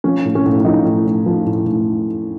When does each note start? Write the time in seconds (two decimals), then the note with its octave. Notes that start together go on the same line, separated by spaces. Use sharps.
0.04 F3 C#4
0.25 A2
0.35 C#4
0.46 A2
0.65 F3 D#4
0.85 A2
1.06 A2
1.26 F3
1.46 A2
1.66 A2